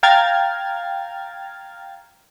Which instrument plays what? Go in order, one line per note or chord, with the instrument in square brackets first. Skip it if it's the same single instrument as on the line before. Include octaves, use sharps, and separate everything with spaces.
[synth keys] F5 G5 A#5 F6 G#6 A6